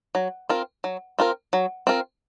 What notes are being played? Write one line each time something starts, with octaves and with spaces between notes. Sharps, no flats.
F#3
C4 F4 A#4
F#3
C4 F4 A#4
F#3
C4 F4 A#4